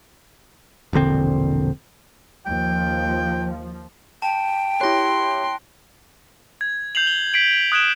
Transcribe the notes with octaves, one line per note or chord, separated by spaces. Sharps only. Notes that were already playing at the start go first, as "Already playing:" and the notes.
E1 A#1 D3 C4
D#2 F3 G5
G5 A5
E4 G4 C#5 C6 F#6 A#6
G#6
G6 C7 F7 F#7
G7
B6 C7 D7 F#7
D#6 F#6 G#6 D7 E7 G7